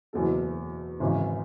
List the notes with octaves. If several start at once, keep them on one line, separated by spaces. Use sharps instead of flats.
F#1 E2 B2 F#3 A4
G#1 F#2 C#3 E3